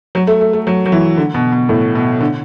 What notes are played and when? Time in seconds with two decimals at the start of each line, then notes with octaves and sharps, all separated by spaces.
0.15 F#3
0.27 A3
0.41 A3
0.53 A3
0.67 F#3
0.86 F#3
0.92 E3
1.17 D3
1.34 B2
1.52 B2
1.69 A2
1.95 B2
2.21 D3